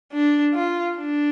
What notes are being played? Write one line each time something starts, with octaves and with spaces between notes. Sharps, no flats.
D4
F4
D4